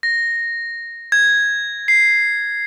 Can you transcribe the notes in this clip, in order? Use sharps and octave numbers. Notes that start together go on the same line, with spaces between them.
A#6
G#6
C7